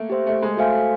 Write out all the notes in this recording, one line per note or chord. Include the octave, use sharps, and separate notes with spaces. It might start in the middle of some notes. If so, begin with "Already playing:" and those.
Already playing: A3 A#3
G4 C5 E5
A3
G#3
A3 F#4 A4 C5 F5 G#5